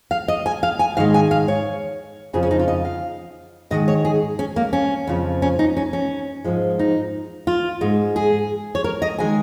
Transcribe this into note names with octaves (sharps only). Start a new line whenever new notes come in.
F5
D#5
G#5
F5
G#5
G#2 D#3 G#3 F5
G#5
F5
C#5
F2 C#3 F3 G#4
C#4
D#4
F4
D#5
F5
G#2 D#3 G#3 D#5
C#5
G#4
C#4
A#3
C#4
F2 C#3 F3
C#4
D#4
C#4
C#4
G#2 F3 G#3
D#4
F4
G#2 G#3
G#4
C#5
A#4
D#5
D#3 G#3 G#5